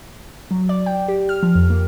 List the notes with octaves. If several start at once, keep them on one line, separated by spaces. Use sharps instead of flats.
F#3
D5
G5
G4
F6
F3
F2
A#3